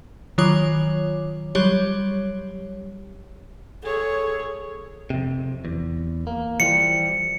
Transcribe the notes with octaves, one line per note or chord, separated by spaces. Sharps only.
D#3 F#3 F4 C#5 D6
F#3 G3 G4 C#5
G#4 A4 C#5
F2 C3
E2
A#3
E3 F3 G3 C#7